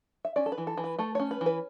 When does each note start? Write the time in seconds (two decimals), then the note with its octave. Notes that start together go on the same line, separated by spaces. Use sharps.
0.25 E5
0.36 C#4 D5
0.46 A4
0.52 B4
0.58 E3
0.67 A4
0.77 E3
0.84 B4
0.99 A3 A4
1.15 C#4 C#5
1.31 B4
1.41 E3
1.46 B4